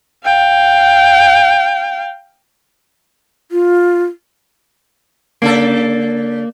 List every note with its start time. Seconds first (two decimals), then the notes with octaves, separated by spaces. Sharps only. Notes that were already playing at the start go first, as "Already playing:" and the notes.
0.25 F5 G5
3.52 F4
5.42 C#3 A#3 D4 A4